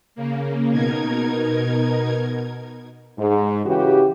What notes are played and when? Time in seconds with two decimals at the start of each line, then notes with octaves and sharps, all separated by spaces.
0.15 C#3 A#3
0.71 B2 D#4 A#4 G#6
3.18 G#2
3.65 C#3 E3 F#4 G4